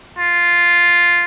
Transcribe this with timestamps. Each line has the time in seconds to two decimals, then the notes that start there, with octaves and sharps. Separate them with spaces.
0.19 F4